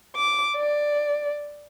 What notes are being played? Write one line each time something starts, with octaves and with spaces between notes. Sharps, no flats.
D6
D5